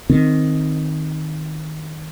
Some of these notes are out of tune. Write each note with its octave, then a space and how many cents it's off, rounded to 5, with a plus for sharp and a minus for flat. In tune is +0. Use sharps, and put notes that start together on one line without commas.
D#3 +0 C4 +0